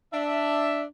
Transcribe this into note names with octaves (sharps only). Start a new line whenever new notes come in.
D4 E5